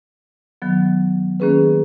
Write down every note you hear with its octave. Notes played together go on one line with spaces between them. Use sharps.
D#3 F#3 B3
D#3 A#3 C#4 G#4 B4